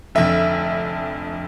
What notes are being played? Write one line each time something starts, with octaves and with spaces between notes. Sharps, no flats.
F1 F2 D3 E5